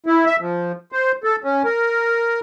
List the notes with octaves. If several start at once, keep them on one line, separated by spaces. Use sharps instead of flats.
E4
E5
F3
C5
A4
C#4
A#4